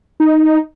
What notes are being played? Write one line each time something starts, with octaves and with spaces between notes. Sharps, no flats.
D#4